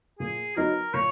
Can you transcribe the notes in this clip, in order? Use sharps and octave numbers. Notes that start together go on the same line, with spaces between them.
A#2 G#4
F#3 B3 D#4 A#4
A#2 C#5